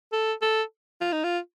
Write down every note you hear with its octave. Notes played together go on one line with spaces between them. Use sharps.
A4
A4
F4
D#4
F4